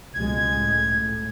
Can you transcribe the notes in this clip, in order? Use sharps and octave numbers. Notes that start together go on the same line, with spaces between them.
C#2 B2 G#3 G#6
A2